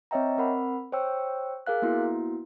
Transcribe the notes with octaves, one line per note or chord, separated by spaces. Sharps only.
C4 C#5 D#5 E5 G5 A#5
C4 A#4 F#5 B5
C5 C#5 G5 E6
G#4 A#4 F5 F#6
A#3 B3 E4 F#4